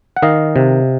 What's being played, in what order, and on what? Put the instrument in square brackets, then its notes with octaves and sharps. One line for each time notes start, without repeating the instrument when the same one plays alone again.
[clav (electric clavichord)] F#5
D#3 D#5 F5
C3